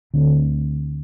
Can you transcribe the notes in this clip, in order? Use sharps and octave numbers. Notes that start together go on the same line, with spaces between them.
D2 D3 A3 C4